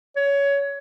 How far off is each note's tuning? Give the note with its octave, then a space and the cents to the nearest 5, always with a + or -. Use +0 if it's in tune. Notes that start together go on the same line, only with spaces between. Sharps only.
C#5 +20